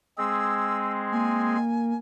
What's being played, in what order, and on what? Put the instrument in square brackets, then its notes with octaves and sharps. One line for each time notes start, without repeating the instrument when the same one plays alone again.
[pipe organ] G#3 C4 G#4 [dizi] E6
[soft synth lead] A#3 [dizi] G#5